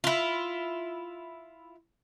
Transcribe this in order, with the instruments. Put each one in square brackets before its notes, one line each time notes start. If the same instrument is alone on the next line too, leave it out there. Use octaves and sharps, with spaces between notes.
[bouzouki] E4 F4